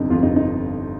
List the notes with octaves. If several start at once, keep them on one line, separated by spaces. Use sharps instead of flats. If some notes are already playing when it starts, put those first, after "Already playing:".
Already playing: G1 F2 C3 D4 D#4
G1 F2 C3 F4
D#4
D#4